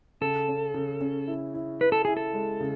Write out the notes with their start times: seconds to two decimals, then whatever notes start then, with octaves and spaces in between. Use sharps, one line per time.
0.21 C#3 A4
0.48 C#4
0.74 C#3
1.01 C#4
1.27 E4
1.54 E4
1.81 E4 B4
1.92 A4
2.05 E4 G#4
2.17 A4
2.33 G#3
2.60 C#3